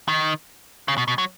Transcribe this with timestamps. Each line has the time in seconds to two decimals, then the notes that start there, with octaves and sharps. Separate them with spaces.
0.08 D#3
0.88 C#3
0.98 B2
1.08 B2
1.18 F#3